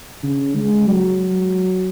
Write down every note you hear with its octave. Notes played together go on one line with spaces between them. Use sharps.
C#3
G#3
F#3